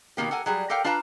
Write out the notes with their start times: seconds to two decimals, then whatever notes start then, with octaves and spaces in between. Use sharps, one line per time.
0.17 B2 D#3 A#3 G4
0.31 A4 A#4 F#5 G#5
0.46 F#3 G3 G#4
0.70 G4 A4 A#4 F5 G5
0.84 D4 F4 B4 F5 A5 A#5